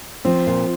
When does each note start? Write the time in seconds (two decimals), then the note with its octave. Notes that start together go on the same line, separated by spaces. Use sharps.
0.25 F3 C4
0.47 A#2